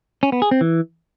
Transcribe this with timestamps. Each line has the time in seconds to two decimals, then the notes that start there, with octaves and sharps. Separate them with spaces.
0.23 C#4
0.32 B3
0.42 G#4
0.51 C4
0.61 E3